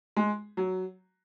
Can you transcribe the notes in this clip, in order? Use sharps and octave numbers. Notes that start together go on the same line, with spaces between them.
G#3
F#3